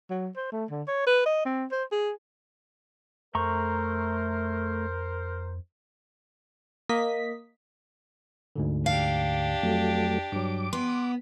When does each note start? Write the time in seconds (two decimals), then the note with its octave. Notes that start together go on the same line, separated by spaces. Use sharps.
0.10 F#3
0.37 C5
0.52 A3
0.71 D3
0.88 C#5
1.07 B4
1.26 D#5
1.46 C4
1.72 C5
1.92 G#4
3.35 F2 A3 A#4 C5 A#5 C#6
6.89 A#3 D#5 B6
8.56 D2 G#2 D3
8.86 D4 G4 F5
9.63 F2 F#3 A3
10.32 G2 F#3 D6
10.73 B3 C6